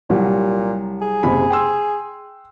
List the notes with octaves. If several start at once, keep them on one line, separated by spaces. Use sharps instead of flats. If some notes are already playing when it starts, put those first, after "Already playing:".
C2 A#2 F#3 G3
G#4
F#1 C3 B5
G5 C6 E6